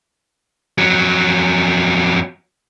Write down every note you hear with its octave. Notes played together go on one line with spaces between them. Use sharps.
F2 F#3